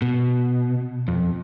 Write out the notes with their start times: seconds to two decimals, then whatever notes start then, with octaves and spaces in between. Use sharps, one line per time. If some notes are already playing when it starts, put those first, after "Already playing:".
0.02 B2
1.08 F2